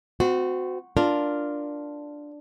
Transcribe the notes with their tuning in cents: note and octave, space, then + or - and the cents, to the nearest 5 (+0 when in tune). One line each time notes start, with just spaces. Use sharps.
C4 -35 F#4 -10
D4 +0 F4 +0 A#4 +0